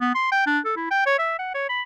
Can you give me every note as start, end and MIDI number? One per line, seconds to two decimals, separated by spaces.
0.01 0.12 59
0.15 0.28 84
0.32 0.42 79
0.47 0.59 62
0.65 0.74 69
0.77 0.86 64
0.91 1.02 79
1.06 1.17 73
1.19 1.34 76
1.39 1.53 78
1.54 1.65 73
1.69 1.82 83